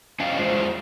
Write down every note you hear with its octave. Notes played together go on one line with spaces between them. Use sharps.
C#4 D#5 F5 G5
E2 F#3 G#3 F4 C5